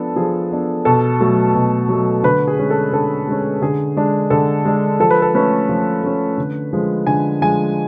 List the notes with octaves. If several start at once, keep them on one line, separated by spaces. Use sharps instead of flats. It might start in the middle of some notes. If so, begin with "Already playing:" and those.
Already playing: F3 B3 D4 A4
F3 G#4
B3 D4
B2 A4
F#3 A3
B2
F#3 A3
D3 B4
G#4
G#3 C#4
A4
D3 A4
G#3 C#4
D3 G#4
G#3 D4
D3 A4
G#3 D4
F3 A4
B4
A4
A3 C#4 B4
F3
A3 C#4
D3
F3 G#3
D3 G#5
F3 G#3 G#5